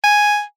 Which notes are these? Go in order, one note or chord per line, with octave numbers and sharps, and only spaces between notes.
G#5